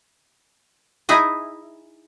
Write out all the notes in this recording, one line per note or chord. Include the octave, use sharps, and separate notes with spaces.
D#4 E4 G#4 D#5